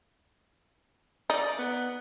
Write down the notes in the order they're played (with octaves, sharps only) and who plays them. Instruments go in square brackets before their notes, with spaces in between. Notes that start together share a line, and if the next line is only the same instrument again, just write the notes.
[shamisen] D#4 [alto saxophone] D5
[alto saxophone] B3